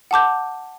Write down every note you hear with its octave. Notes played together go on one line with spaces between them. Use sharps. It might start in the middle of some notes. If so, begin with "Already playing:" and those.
F#5 A5 D6 G6